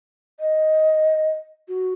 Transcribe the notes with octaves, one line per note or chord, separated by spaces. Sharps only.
D#5
F#4